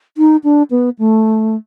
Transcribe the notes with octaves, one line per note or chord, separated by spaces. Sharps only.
D#4
D4
B3
A3